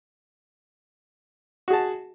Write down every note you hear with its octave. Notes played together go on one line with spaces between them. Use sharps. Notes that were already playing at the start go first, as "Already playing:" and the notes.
F#4 G#4 A5